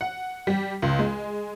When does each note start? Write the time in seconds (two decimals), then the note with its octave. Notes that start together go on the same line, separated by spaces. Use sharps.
0.01 F#5
0.47 G3
0.82 C#2
0.99 G#3